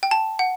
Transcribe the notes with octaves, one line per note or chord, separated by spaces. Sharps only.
G5
A5
F#5